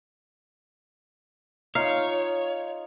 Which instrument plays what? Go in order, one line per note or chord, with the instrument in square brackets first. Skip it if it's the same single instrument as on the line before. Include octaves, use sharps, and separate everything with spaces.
[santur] D#4 F4 [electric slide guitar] C#5 [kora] F5